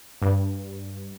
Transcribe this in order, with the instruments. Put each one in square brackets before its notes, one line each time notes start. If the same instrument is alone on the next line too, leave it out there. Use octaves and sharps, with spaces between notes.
[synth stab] G2